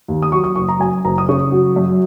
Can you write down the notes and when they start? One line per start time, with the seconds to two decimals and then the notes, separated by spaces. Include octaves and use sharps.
0.08 D#2
0.22 D#6
0.32 F#3 C#6
0.44 D#6
0.56 F#1 C#6
0.69 A#5
0.80 F#2 G#5
1.05 F#1 A#5
1.18 D#6
1.29 C#3 C#6
1.52 F#3
1.76 F#2